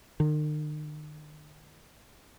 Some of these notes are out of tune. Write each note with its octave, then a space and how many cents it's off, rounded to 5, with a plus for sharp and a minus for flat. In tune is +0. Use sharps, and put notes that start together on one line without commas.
D#3 -45